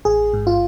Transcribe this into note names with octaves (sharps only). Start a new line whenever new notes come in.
A1 G#4
G#2
F4